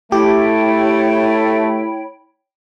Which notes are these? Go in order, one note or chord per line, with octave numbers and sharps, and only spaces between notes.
A3 E4 G4 C#5 G5 B5